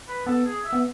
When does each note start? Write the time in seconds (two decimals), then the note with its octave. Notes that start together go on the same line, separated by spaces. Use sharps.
0.08 B4
0.26 B3 A4
0.46 G#4
0.65 E5
0.73 B3